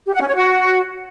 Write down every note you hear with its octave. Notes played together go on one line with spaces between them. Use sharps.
G4
F#5
C#4
C#5
F#4